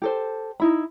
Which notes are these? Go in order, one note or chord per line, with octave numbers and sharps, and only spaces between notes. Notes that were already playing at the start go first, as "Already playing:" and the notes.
G4 A4 C5
D#4 E4 B5